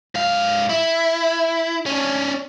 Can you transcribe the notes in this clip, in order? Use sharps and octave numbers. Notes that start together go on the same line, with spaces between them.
G#2 F5
E4
C#4 D4